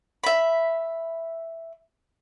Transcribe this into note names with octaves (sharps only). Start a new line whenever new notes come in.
E5 B5